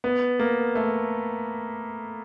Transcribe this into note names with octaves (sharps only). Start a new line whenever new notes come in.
B3
A#3
A3